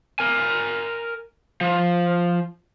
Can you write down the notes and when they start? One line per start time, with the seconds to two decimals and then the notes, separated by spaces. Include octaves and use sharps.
0.19 A#4 G#5
1.61 F3